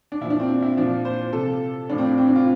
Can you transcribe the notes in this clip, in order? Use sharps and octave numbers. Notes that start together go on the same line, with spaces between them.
D4
A#2 F3 E4
D4
C4
D4
E4
A#2 F3 D4
C5
C3 F3 A4
A2 F3 D4
C4
D4
C4
D4
F4